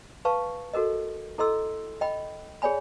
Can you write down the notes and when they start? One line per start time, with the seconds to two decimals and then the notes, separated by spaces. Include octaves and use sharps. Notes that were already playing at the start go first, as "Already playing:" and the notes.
0.25 B4 F5 A5 C#6
0.73 F#4 A4 A#4 D#5
1.38 E4 A4 D#5 C6 E6
2.01 D#5 G5 B5
2.62 G#4 C#5 D5 G#5 B5